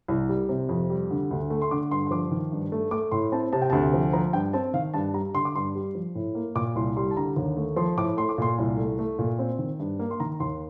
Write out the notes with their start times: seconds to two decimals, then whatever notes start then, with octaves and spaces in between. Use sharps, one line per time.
0.08 C2
0.29 G3
0.49 C3
0.69 F2
0.90 G3
1.11 D3
1.31 D2
1.50 A3
1.62 C6
1.71 D3 D6
1.91 G2 C6
2.07 C6
2.11 F3 D6
2.31 D#3
2.52 G2
2.72 A3
2.91 A3 D6
3.12 A2 C6
3.32 C4 A5
3.53 C3 A5
3.62 G5
3.70 D2 A5
3.94 F3
4.13 F3 A#5
4.33 G2 G5
4.53 C4 A5
4.74 D#3 F5
4.94 G2 A5
5.14 G3 A#5
5.34 D3 C6
5.45 D6
5.55 G2 C6
5.75 G3
5.95 F3
6.15 A2
6.35 A#3
6.55 A#2 D6
6.75 C2 C6
6.97 G3 C6
7.11 A5
7.16 D3 A#5
7.36 D#2
7.57 A3
7.76 F3 C6
7.97 A2 D6
8.17 A3 C6
8.29 D6
8.38 A#2 C6
8.58 C2
8.77 A3
8.99 A3
9.19 A#2
9.39 C4
9.58 D#3
9.80 G2
9.99 A#3
10.11 C6
10.20 D#3 A#5
10.40 D#2 C6